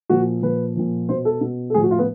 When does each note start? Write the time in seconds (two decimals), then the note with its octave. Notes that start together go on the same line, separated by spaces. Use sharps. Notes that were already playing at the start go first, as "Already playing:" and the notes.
0.09 A#2 F3 F#4
0.42 A#2 F3 B4
0.76 A#2 F3
1.09 B2 C5
1.25 A4
1.41 B2
1.70 A4
1.74 A2 F3 G#4
1.83 F#4
1.91 F4
1.99 B3